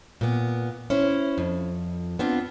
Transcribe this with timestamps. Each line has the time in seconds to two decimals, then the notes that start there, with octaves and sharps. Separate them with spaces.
0.21 A#2 B3
0.90 C#4 E4 C5
1.38 F2
2.19 B3 C4 D4 F4